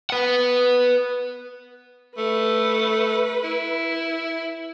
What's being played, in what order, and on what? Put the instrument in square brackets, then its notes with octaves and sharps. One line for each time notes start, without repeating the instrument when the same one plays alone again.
[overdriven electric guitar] B4 F#5
[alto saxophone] A3 [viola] B4
[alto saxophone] E4